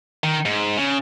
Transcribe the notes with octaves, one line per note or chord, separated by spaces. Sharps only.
D#3
G#2
C#3